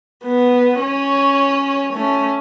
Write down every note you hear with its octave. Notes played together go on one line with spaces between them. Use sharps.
B3
C#4 C#5
A3 C#4